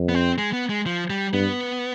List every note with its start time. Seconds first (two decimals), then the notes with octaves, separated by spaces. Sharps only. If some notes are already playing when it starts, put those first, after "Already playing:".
Already playing: F2
0.09 B3
0.15 C4
0.38 G#3
0.53 B3
0.69 G#3
0.86 F3
1.10 G3
1.33 G2 B3